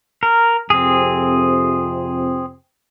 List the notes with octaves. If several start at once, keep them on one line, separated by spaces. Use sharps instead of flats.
A#4
F2 C3 C4 G#4